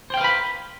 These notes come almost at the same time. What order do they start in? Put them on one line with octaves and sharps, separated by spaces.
C5 G5 F5 B4 B5